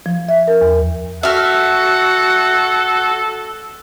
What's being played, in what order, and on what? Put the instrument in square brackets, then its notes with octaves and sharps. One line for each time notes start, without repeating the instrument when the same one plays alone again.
[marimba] F3
E5
A#4
E2
[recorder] F#4 [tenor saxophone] A4 [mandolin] E5 F6 [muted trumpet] F#5